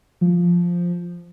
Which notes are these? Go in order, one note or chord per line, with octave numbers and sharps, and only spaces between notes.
F3